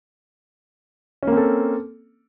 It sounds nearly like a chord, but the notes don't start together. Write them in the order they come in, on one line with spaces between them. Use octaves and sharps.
C#4 A#3 C4 A4